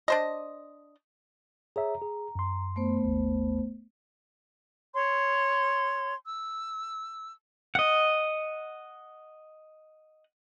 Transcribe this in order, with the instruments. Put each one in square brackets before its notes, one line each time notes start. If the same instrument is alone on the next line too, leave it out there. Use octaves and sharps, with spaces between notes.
[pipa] D4 C5 D#5
[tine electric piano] G#4 C#5 E5 [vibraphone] A#5
[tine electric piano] G#4
F#2 C6
[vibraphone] A3 B3 C5
[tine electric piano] G#1 D#2
[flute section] C#5 C6
E6
[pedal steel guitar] D#5 F#5